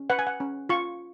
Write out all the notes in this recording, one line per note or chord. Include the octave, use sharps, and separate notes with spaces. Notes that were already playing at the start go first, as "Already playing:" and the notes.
Already playing: C#4
B4 F#5
G#5
F#5
C#4
F4 C#6